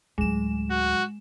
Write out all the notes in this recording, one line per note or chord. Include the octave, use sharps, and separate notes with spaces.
D2 A2 F#3 G#3 E7
F#4